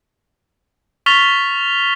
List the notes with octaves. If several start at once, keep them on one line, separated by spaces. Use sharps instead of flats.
C#6 F6 A6 B6 F7 G7